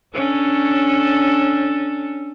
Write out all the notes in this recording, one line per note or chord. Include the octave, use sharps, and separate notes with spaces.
C#4 D4 A4